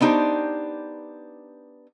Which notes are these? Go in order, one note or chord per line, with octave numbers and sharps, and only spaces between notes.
B3 D4 D#4 G4 C5